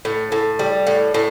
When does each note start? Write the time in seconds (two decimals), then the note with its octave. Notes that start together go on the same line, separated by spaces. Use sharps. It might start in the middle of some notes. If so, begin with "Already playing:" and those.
0.05 A2
0.32 A2
0.59 G3
0.87 A2
1.14 A2